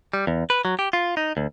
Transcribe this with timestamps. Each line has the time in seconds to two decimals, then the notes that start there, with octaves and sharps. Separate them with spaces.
0.13 G3
0.27 E2
0.50 B4
0.65 F#3
0.79 G4
0.93 F4
1.17 D#4
1.37 D2